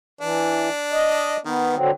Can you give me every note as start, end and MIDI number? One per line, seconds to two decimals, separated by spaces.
0.21 0.69 52
0.21 1.38 62
0.92 1.37 75
1.45 1.76 51
1.45 1.75 59
1.75 1.91 50
1.75 1.91 54
1.75 1.91 60